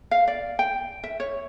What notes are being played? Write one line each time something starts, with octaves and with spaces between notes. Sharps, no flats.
F5
D5
G5
E5
C#5